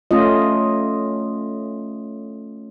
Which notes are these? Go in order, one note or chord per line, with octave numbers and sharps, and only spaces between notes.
A3 C#4 F4 D#5